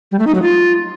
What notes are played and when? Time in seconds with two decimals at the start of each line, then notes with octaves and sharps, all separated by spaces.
0.12 G3
0.19 A3
0.27 D#4
0.35 F#3
0.42 F4